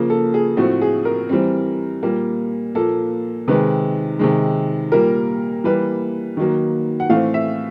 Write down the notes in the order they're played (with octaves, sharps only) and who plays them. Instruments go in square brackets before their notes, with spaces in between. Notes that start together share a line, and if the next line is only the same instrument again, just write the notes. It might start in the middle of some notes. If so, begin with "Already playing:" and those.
Already playing: [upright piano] C#3 F3 A#3
A4
G#4
A2 F3 A3 C4 F#4
G#4
A#4
E3 G3 C4
A#2 G3 A#3
A#2 F3 A#3 A4
C3 D#3 G#3 B4
C3 D#3 G#3
A#2 G3 A#3 A#4
E3 G3 A#3 B4
D#3 F#3 A#3
F#5
A2 E3 A3 C4 F5
E5